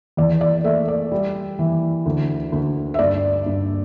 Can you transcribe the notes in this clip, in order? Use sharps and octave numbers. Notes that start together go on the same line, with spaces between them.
E2 D5
D5
A3 E5
D5
G3
E3
D2
D2
E5
G2 D5
G2